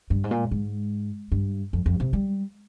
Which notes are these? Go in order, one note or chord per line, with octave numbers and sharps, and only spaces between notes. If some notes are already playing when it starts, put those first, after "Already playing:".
G2
G#2
A#2
G#2
G2
F2
F2
C3
G3